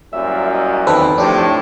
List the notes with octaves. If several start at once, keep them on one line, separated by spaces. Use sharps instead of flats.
C2 F#2 A#2 E5
D#5
E2 D#3 C4 D#4 A4 B4
A2 F3 D4 G4 C5 D6